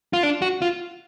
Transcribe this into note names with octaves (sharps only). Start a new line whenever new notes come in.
F4
D4
F#4
F4